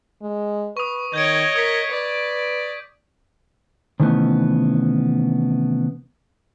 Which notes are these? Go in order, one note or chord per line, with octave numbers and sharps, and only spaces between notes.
G#3
B4 C#6 D#6
D#3 C#5 D#5 G6 G#6 D7
A#4 D#6 B6
B4 D5
C3 D#3 E3 A3 B3 C#4